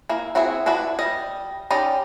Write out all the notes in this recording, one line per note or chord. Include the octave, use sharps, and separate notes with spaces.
A#3 E4
C4 E4 F#4 G#4 E5
D4 E4 F#4 B4
G3 D#5
C#4 D#4 G4 D5 D#5